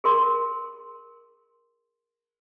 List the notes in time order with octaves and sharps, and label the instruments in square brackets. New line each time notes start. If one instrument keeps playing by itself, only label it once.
[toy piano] G#4 A#4 C6